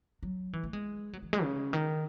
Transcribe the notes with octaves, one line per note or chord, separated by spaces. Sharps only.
F#3
E3
A3
G#3
F#3
E3
G#3
C#3
D#3